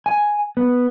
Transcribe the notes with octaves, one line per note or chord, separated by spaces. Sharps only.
G#5
B3